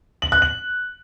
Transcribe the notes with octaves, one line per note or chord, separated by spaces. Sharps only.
F#7
F#6
F#7